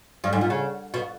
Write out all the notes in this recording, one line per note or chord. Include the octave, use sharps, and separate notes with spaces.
G2
G#2
A#2
C#3
B2